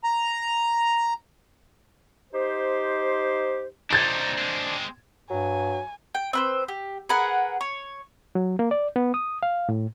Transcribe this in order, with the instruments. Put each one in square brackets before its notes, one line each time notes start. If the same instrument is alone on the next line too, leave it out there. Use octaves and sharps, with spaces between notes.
[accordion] A#5
[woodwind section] D#4 G4 C5
[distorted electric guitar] C3 D#4 [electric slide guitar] D4 C5 D5 [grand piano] G#6 A6 E7
[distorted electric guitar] G#3 C4
[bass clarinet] G2 [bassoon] F#3 [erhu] G#5
[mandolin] G5
C4 B4 C5
G4
G#4 A#4 B4 F#5
C#5
[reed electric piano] F#3
A#3
D5
B3
D#6
F5
A2